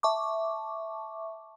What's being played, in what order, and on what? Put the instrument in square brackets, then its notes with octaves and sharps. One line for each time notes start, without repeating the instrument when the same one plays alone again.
[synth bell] E5 A5 C#6 D6